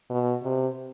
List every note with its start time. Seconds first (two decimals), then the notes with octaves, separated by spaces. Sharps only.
0.10 B2
0.44 C3